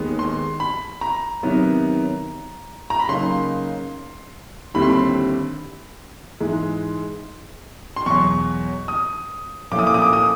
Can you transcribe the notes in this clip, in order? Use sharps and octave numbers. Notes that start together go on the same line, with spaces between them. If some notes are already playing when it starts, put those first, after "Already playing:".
Already playing: D#2 D#3 G#3 B3
C6
B5
A#5
C3 D#3 F#3 B3
A#5
B5
C#3 F#3 A#3 D#4 C6
D#2 D3 G3 C4 E4 B5
C6
B5
G#2 E3 G#3
C6
E2 B2 F#3 C#6
D#6
A#2 F3 A3 C#4 E4 D6
D#6
D6
D#6
D6
D#6